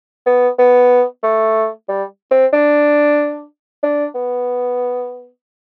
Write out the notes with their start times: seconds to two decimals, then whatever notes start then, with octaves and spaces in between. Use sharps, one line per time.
0.26 B3
0.58 B3
1.23 A3
1.88 G3
2.31 C4
2.53 D4
3.83 D4
4.15 B3